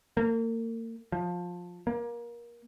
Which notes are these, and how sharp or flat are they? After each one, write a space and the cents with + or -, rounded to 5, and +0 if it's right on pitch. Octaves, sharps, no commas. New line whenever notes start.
A#3 -40
F3 +15
A#3 +25